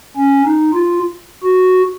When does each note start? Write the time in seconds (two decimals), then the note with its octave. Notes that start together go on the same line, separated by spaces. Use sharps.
0.17 C#4
0.45 D#4
0.74 F4
1.43 F#4